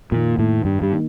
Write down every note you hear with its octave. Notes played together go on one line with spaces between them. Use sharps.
F2 A#2 D#3 A#3 D#4
A2
G2
G2
D#3 A#3 D#4